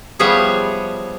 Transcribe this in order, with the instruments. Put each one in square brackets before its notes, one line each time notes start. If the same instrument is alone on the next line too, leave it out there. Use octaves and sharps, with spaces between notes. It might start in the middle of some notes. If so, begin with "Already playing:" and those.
[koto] F3 G3 B3 G#4 C#5 E5